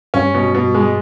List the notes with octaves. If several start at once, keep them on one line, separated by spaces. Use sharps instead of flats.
G2 C#4
B2
B2
G#3